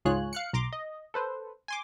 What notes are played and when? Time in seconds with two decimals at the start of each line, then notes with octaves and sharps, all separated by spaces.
0.05 C#2 G#2 F4 G#4 C#5 F#6
0.33 F5 F#6 C#7
0.53 B1 A#5 C6 D6
0.73 D#5
1.14 A4 B4 C5
1.68 G#5 C6 D6